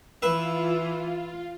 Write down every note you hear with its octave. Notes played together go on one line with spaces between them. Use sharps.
E3 F4 B4 E5